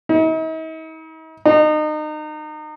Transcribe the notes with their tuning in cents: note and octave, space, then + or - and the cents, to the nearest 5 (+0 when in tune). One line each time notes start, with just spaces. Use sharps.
D#4 +45
D#4 -30